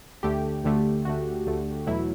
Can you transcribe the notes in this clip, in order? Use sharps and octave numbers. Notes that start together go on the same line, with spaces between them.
D2 D3 A3 G4
D2 D3 A3
D2 D3 A3 F#4
D2 D3 A3
E2 B2 F#3 A3 E4